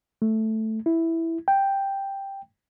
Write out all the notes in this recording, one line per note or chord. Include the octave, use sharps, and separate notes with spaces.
A3
E4
G5